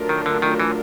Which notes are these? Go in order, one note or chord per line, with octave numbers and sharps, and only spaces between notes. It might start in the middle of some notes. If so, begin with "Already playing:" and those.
Already playing: F#3 A3 D4 F4 A#4
D#3
D3
D#3
E3